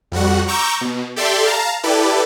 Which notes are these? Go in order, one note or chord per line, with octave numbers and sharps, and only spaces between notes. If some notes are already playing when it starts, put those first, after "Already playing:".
F2 G3 F#4 F#5
A#5 C#6 D6 E6 G6
B2
G4 A4 D5 E5 G5 C6
F5 A5 A#5
E4 G4 A4 B4 D5